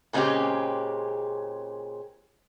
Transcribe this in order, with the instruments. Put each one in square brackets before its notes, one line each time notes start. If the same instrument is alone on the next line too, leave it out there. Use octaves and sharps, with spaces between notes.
[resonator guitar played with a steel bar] A#2 C#3 G#3 C4 C#4 G4